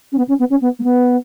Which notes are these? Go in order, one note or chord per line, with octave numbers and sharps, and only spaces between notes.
C#4
B3
C#4
B3
C#4
B3
A#3
B3